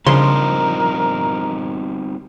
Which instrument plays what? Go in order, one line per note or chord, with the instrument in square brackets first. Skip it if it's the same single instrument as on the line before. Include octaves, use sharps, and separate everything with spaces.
[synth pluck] C#3 C6 [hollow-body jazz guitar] F3 D4 [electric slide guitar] G3 C4 D#4 [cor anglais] A#4